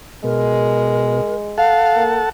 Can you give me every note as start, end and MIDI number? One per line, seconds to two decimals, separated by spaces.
0.24 1.21 47
0.24 1.60 56
0.24 1.35 70
1.58 2.29 69
1.58 2.04 77
1.58 2.29 78
1.58 2.29 81
1.96 2.19 58